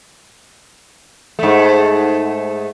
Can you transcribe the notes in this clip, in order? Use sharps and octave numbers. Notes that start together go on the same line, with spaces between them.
G#2 A3